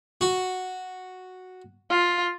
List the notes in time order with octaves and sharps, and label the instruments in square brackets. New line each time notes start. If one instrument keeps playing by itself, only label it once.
[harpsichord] F#4
[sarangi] F4